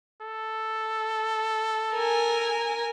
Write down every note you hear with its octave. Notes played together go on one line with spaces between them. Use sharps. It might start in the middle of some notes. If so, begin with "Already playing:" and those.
A4
A#4 G#5